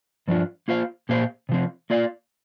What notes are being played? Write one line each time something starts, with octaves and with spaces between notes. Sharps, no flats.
G2 F3 D4 F4
A#3 F4 C5 F5
A#2 A#3 G4 C5 F5
C3 F3 C4
A#3 F4 D5 F5